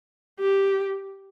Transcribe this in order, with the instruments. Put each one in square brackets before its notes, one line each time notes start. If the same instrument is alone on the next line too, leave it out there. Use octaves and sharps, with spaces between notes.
[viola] G4